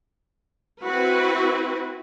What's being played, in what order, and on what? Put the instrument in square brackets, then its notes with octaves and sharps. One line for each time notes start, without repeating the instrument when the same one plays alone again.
[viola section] C4 E4 F#4 B4